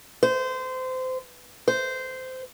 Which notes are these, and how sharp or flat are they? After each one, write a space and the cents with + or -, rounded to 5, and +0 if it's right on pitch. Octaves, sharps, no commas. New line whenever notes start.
C5 -25
C5 -15